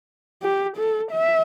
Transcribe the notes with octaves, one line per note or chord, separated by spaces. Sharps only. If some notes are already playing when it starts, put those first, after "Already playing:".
G4
A4
E5